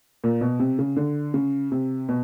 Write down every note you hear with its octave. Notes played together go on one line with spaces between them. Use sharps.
A#2
B2
C3
C#3
D3
C#3
C3
B2